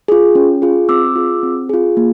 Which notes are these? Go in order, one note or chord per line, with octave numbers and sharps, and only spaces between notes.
F4 G#4
C#4
F4 G#4
C4 D6 E6
F4 G#4
C4
F4 G#4
A#3